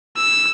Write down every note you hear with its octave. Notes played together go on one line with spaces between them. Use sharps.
E6